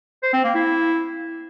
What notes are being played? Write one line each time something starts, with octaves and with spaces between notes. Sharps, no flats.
C5
C4
A#3
E4